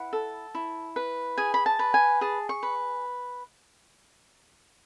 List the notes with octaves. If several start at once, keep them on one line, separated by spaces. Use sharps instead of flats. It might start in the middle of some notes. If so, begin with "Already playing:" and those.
Already playing: E4 B4 F#5
A4
E4
B4
G#4 G#5
B5
A5
B4
G#5
G#4 A5
C#6
B4